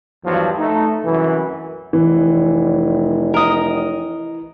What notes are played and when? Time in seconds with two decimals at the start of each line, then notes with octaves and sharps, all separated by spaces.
0.24 E2 G2 F3 F#3
0.57 A3 D#4
1.04 C2 F#2 E3
1.93 F1 E3
3.34 A#4 D#5